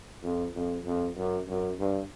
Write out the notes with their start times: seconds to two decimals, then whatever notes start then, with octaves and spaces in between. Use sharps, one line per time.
0.23 F2
0.54 F2
0.85 F2
1.16 F#2
1.47 F#2
1.79 G2